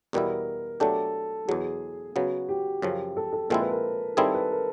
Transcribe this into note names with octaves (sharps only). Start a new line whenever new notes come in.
E2 B2 G3 B3 E4 A#4
B2 F#3 A3 D4 G4 A4
E2 B2 F#3 G#4
C#3 F#3 B3 F#4
G4
F#2 C#3 F3
A4
A4
A#2 F3 G#3 C4 E4 A4
B4
A#4
D#3 G3 C4 E4 G#4 A4
B4
A#4